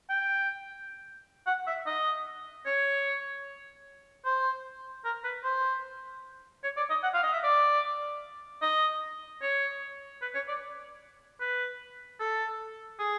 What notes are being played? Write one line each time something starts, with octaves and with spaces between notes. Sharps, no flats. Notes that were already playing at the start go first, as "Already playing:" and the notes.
G5
F#5
E5
D#5
C#5
C5
A#4
B4
C5
C#5
D5
D#5
F#5
F5
D#5
E5
D5
D#5
C#5
B4
C#5
D5
B4
A4
G#4